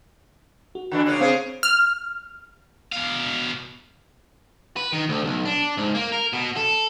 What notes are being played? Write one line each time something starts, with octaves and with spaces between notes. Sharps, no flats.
F#4
D3 E3 D4
C#3 A#3 C#4 F#6
C#3 C4 G#4 C5 F5
F6
B2 F5
B4
D#3
D2
B1
D4
G#2
A#3
A#4
B2
A4